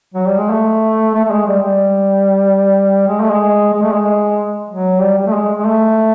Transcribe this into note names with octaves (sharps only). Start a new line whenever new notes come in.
F#3
G3
G#3
A3
A3
A3
G#3
G3
G3
G#3
A3
G#3
G#3
A3
G#3
F#3
G3
G3
A3
G#3
G#3
A3